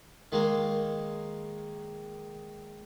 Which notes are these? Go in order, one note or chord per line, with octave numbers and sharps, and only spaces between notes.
D#3 G#3 A#3